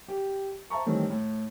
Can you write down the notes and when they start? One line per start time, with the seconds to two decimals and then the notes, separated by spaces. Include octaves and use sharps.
0.08 G4
0.70 C5 E5 A5 A#5 C#6
0.86 D#3 E3 G3 A3 C4 C#4
1.10 A2